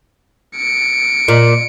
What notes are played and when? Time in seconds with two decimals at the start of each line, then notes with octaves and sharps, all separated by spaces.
0.56 C#7 D7
1.28 A#2